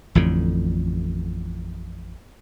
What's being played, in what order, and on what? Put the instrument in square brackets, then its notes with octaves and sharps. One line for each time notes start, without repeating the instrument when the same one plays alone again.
[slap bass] A1 F2 A2 D3